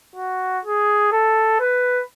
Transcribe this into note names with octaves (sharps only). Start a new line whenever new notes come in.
F#4
G#4
A4
B4